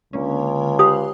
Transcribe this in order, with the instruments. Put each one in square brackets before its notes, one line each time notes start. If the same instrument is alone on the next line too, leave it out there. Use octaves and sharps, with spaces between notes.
[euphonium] C#2 [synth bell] D3 A#3 C#4
[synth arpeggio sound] G4 [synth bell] C5 F5 F#5 [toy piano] D#6